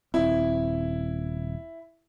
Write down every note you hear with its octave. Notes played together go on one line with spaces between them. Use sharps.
D#1 C4 E4